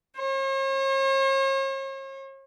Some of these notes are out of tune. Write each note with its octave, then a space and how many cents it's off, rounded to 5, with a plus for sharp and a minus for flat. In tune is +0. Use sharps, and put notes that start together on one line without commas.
C#5 -45